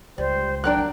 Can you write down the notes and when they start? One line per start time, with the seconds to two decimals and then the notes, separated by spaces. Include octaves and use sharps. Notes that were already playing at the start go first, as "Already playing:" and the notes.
0.18 C#2 G3 C5
0.64 F#3 D4 A#4 D5 G5 F#6
0.78 C4